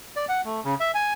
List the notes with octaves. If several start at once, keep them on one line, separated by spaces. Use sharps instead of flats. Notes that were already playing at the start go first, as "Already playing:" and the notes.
D5
F#5
A3
C#3
E5
G#5